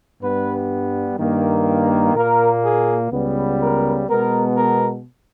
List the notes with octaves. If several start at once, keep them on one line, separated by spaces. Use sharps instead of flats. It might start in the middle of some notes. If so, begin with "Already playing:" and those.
G2 G3 B3 B4
G2 D#3 A#3
A#2 A#3 A#4
G#4
C#2 C#3 G3 B3
A#4
B2 G#3 B3 A#4
A#4